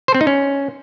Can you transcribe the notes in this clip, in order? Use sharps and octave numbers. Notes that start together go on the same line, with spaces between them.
C5
C4
D#4
C#4